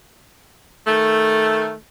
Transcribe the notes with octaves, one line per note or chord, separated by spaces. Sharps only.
D#3 A3